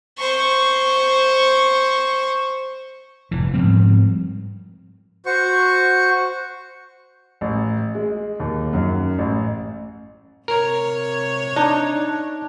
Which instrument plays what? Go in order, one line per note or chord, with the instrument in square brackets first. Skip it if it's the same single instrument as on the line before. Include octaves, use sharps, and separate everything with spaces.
[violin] C5 C#6
[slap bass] F1 E3
G#2 F3 G3 C4
[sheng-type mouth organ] F#4 C5 C#6
[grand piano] A1
G#3
D#2
F#2
A1
[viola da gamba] C3 C#5 [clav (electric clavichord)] A#4
[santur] D4 [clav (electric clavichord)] D#4